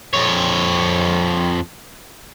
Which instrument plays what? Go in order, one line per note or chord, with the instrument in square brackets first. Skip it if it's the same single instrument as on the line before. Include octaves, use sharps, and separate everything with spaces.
[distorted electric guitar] F2 C#5